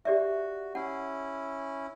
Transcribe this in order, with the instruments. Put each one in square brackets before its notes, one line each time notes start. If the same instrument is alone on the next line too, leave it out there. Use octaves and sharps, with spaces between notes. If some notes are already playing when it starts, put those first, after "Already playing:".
[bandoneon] F#4 [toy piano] G4 D5 E5
[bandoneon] C#4 E4 [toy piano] F#5